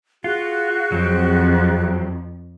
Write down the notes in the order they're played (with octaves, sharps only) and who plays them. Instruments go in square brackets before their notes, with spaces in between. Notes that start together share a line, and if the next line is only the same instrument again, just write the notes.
[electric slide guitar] F4 [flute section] F#4 F#6 [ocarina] G#4
[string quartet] F2 [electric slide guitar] F#3 C4